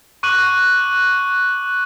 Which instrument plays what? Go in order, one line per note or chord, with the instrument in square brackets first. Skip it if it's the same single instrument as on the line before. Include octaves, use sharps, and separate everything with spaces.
[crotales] C#6 D6 F#6 D#7 F#7